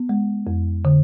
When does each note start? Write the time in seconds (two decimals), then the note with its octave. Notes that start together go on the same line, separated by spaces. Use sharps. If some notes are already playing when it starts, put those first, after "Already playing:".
Already playing: B3
0.09 G#3
0.47 F2
0.85 D3